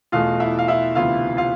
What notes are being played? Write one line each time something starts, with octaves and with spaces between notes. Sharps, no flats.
E2 B2 A3 F4 F5
E4 E5
F5
E4 E5
D2 C3 E3 B3 E4 F4 F5
F4 F5